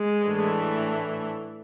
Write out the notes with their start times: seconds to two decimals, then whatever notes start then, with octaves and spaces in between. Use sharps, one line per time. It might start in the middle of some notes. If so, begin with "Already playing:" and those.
Already playing: G#3
0.25 A2 E3 A3 D4